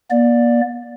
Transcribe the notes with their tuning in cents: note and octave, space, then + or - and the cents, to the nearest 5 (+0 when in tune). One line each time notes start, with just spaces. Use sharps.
A#3 +45 D5 +0